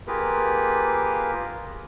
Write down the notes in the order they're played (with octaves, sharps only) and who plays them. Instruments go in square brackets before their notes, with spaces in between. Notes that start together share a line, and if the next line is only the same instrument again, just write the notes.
[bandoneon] A#3 F4 G4 G#4 A#4 B4